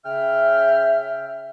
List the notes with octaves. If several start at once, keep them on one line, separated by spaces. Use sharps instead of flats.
C#3 E5 G5 F6